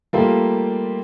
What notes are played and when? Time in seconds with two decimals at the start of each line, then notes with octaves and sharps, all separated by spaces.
0.13 G3 A3 A#3 F4 G4 A4